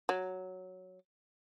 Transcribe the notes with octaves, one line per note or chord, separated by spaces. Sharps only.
F#3